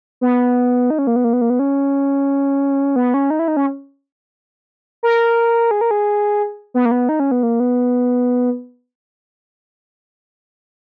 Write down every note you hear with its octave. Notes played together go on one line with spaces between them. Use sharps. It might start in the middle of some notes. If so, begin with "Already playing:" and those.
B3
D#4
C#4
A#3
B3
A#3
B3
A#3
B3
C#4
B3
C#4
D#4
E4
D#4
C#4
A#4
G#4
A#4
G#4
B3
A#3
B3
D#4
C#4
B3
A#3
B3